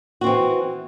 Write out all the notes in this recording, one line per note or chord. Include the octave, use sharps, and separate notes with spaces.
E3 C4 F#4